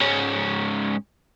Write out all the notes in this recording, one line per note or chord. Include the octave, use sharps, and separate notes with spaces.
G#2 C#4